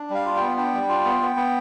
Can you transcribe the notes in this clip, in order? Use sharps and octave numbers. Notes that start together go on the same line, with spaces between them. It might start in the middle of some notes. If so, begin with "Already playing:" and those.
Already playing: D4
G3 F5
F4
B3 G5
D4 G5
G3
F4
B3
B3
B3